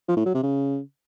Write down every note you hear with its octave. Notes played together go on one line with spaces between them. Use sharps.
F3
A2
F#3
C3
C#3